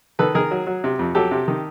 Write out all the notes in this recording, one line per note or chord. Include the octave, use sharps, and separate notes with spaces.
D#3 A4 B4
D#3 G#4 A#4
F#3
F#3
C3
F2
F#3 G4 A4
C3
D#3